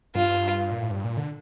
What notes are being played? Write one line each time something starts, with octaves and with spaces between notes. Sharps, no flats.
G2 F4
A#2
A2
G2
A#2
D3